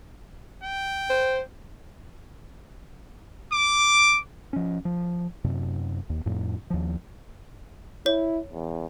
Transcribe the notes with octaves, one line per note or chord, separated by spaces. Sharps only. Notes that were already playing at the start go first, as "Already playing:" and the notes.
G5
C5
D6
F3 C#4
F3
F#2 C3
D#2
F2 A2
D#2 F3
E4 C#5
E2